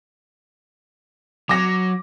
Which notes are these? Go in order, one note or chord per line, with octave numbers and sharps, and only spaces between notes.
F#3 D6 A#6